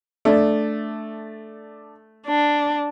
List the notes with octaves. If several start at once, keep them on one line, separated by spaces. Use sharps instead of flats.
A3 D4 D5
D4